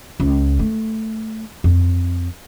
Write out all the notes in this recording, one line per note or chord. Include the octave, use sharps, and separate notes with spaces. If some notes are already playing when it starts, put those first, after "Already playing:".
C#2
A3
F2